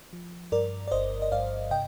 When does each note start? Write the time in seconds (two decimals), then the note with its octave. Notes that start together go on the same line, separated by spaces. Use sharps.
0.13 F3
0.52 G2 A#4 D5
0.88 D5
0.91 G1 C5 D#5
1.22 D#5
1.32 G2 D5 F5
1.71 C3 D#5 G5